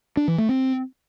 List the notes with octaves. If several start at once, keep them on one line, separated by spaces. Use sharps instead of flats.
D4
E3
A3
C4